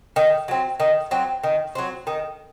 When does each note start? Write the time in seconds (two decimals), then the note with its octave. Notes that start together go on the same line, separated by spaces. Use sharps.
0.16 D#3
0.48 F#3 C4
0.80 D#3
1.11 F#3 C4
1.44 D#3
1.75 F#3 C4
2.07 D#3